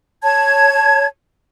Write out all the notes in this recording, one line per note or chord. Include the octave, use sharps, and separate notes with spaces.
C#5 A5 G#6